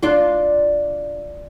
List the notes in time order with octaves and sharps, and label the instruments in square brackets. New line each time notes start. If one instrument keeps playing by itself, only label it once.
[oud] D4 F4